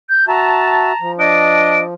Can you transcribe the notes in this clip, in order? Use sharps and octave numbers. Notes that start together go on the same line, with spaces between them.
G6
F#4 E5 A5 A#5
F3
D4 D5 D#5 D7